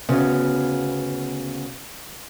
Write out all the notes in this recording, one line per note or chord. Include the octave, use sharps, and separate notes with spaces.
D2 C#3 B3